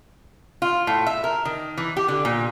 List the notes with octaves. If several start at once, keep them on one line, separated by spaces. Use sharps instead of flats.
F4
A2
E5
A#4
D#3
E3
G4
D3
A#2